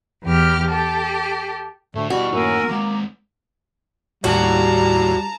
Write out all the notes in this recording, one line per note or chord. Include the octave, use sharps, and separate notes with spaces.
E2 G4 F6
G4 A4
D2 A2 A3
B2 G3 E4 F#4 F#5
F#2 A2 F#3 A#3 D#4 A#4 G#5 E6
D#2 G#3 A#3 A#5 D6
D#2 A2 G3 F#4 A5 A#5